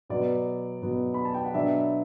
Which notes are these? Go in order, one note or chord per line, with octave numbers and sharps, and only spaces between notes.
B2 F#3 B3 D5
B2 F#3 B3
B5
A5
G5
F#5
B2 F#3 B3 D4 E5